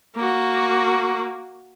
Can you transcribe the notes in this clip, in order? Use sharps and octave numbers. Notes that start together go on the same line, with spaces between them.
A#3 F#4